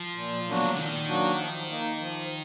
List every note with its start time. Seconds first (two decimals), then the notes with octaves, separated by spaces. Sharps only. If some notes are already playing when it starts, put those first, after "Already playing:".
Already playing: F3
0.16 A#2
0.47 B2 F#3 A#3 D4 F#4
0.64 D3
0.76 A#2 D#3
1.08 F#3 A#3 D4 F#4
1.38 F3
1.70 A#3 D#4
2.00 F3